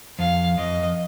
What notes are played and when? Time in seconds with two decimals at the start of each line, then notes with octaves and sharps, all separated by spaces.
0.19 F2 F5
0.58 F2 D#5